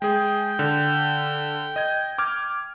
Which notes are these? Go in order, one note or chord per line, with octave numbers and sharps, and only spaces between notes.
G#3 G#4 G5
D3
D#5 G#6
D6 F6 G#6